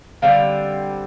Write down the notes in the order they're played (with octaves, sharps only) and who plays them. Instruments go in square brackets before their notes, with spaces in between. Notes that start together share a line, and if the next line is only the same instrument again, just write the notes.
[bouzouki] D3 G3 C4 F5